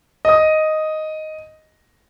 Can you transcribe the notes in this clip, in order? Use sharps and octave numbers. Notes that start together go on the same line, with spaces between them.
D#5 D#6